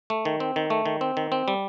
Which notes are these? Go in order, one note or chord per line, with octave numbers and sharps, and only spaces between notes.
A3
D#3
C4
D#3
A3
D#3
C4
D#3
C4
G3